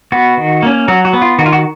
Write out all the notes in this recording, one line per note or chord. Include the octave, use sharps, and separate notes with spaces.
B3 F#4
D#3
A#3 C#4
F#3 F#4
F#4
B3
F4
D#3 F#4
F4
F#4